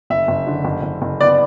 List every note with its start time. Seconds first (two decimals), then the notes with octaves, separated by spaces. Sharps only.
0.10 F#1 E5
0.28 F#1
0.47 D3
0.65 F#1
0.83 F#1
1.02 F#1
1.21 B3 D5